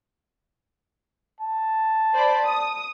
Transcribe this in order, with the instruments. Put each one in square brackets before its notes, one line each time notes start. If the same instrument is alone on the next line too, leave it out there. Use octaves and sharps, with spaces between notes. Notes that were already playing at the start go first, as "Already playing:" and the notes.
[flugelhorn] A5
[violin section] C5 D5 B5
D#6